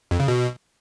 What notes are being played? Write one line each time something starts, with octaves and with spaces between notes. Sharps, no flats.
F2
C#3
B2